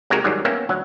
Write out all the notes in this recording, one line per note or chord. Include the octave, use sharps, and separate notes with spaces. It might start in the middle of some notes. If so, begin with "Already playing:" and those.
C3 G#3 C4 D#4 F#4 A#4
G#2 D#3 F#3 G3
A#3 B3 C#4 E5 G5
D2 F#3 F#5